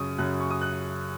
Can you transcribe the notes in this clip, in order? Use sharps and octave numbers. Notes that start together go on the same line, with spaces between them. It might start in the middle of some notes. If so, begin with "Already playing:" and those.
Already playing: F#2 C#3 C#6 D#6
F#2 C#3 F#6
C#6
D#6
F#6